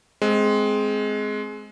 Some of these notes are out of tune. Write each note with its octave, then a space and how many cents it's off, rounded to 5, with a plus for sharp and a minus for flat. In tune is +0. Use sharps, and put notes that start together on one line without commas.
G#3 +15 C4 +0